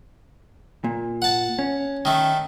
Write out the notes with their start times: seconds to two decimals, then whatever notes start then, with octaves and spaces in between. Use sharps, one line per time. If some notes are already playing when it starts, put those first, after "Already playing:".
0.84 A#2
1.22 F#5 A5
1.59 C#4
2.05 D#3 A3